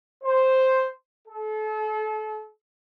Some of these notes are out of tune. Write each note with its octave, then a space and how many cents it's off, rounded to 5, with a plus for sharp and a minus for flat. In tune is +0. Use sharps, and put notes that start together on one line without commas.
C5 +0
A4 -35